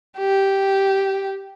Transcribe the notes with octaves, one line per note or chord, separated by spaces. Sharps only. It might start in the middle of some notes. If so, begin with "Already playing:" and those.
G4